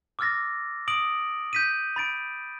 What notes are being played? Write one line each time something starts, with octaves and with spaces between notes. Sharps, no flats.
D6 E6 F6 A6 A#6
D#6 D7 F#7
G6 B6 D#7
B5 A6 D7